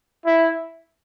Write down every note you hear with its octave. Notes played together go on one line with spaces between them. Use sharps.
E4